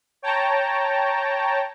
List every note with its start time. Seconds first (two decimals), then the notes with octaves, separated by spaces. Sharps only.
0.22 C#5 G5 A5 A#5